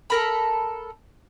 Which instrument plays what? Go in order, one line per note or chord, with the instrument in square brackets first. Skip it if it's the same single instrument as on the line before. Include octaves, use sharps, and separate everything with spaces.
[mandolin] A4 A#4 B5